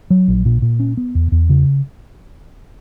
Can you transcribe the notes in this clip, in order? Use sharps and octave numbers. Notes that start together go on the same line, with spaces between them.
F#3
A#1
A#2
A#2
C#4
B3
E2
E2
C#3